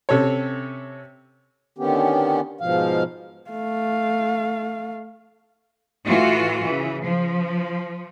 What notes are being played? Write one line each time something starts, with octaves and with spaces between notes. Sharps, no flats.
C3 C#4 A4 C#5
D3 D#3 B3 C#4 G4
G#2 B2 F3 F5
A3 F5
A2 E3 F4 F#4
C#3 E3
F3